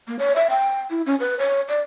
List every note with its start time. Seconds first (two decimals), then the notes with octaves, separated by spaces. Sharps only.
0.08 A#3
0.19 C#5
0.36 E5
0.50 G5
0.90 E4
1.06 C#4
1.20 B4
1.39 C#5
1.68 D5